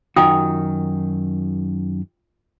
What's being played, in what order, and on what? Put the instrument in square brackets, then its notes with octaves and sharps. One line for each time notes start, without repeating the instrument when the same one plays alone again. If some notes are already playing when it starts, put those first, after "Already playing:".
[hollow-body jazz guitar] F#2 D#3 F#4 [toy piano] F4 G5 D#6